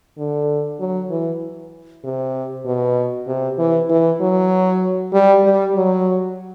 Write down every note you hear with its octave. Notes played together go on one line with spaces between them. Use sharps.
D3
F#3
E3
C3
B2
C3
E3
E3
F#3
G3
G3
F#3